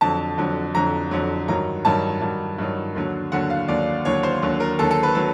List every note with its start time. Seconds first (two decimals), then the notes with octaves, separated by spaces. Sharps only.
0.01 F2 D3 F#3 A5
0.38 F2 D3 F#3
0.74 F2 D3 F#3 A#5
1.11 F2 D3 F#3
1.48 G2 D#3 F#3 A#5
1.85 G2 D#3 F#3 A5
2.21 G2 D#3 F#3
2.58 G2 D#3 F#3
2.95 D#2 D3 F#3
3.32 D#2 D3 F#3 F#5
3.50 F5
3.68 D#2 D3 F#3 D5
4.05 D#2 D3 F#3 C#5
4.23 C5
4.42 D#2 D3 F#3
4.60 A#4
4.79 D#2 D3 F#3 A4
4.91 A4
5.03 B4
5.15 D3 F#3 A4